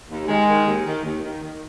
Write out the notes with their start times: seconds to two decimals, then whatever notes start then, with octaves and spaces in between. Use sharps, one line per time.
0.09 D#2
0.28 D#3 G#3
0.47 D#3
0.66 D#2
0.85 D#3
1.04 D#2
1.23 D#3
1.42 D#3